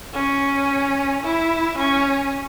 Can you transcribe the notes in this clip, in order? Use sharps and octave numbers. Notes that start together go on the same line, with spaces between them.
C#4
E4
C#4